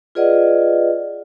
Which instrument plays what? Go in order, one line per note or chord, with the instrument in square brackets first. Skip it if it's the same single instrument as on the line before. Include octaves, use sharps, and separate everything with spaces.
[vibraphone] F4 G#4 B4 D5 D#5 F#5